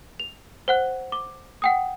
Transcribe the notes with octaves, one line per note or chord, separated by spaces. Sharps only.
F7
C5 F#5 F#6
D6
F#5 G5 D#6